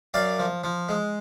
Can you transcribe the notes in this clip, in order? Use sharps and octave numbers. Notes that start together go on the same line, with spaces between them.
F#2 D5 F5
F3
F3
G#3